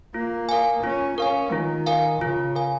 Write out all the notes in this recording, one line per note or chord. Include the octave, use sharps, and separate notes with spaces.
A#3 F4
A#4 F5 G#5
C#4 F4
C#4 A#4 F5 G#5
D#3 F4
A#4 F5 G#5
C#3 F4
A#4 F5 G#5